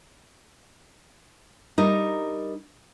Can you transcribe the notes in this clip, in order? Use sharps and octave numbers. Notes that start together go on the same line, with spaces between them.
G3 D#4 A#4